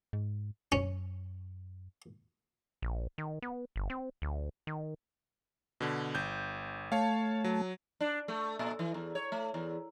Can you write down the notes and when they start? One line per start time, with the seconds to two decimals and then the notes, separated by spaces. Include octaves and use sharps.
0.13 G#2
0.72 F#2 C#4
2.82 A#1
3.18 D#3
3.42 B3
3.76 G1
3.90 C4
4.22 D2
4.67 D#3
5.80 B2 D3
6.15 G1 G6
6.92 A3 C#5 F5 A5
7.44 F#3
8.01 D4
8.28 A3
8.59 A#2
8.79 E3
8.94 E2
9.15 C#5
9.32 A3
9.54 E2